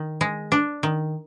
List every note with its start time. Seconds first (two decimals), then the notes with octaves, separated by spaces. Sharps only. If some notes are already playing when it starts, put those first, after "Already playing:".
Already playing: D#3
0.21 G#3
0.52 D4
0.83 D#3